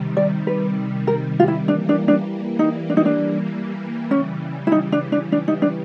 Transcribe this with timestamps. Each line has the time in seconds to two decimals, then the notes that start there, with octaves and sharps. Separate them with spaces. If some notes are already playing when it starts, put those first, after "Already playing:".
Already playing: C3 D#3 G3
0.17 D5
0.47 B4
1.07 A#4
1.40 F4
1.48 E4
1.68 E3 G3 A#3 D4
1.89 D4
2.08 D4
2.59 D#4
2.90 D4
2.97 D#4
3.05 D4
4.11 C#3 E3 G3 C#4
4.67 E4
4.72 D#4
4.92 D4
5.12 D4
5.32 D4
5.48 D#4
5.62 D4